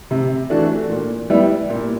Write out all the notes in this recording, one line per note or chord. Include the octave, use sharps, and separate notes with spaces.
C3
E3 A3 D4 F#4
A#2
G3 B3 E4
A#2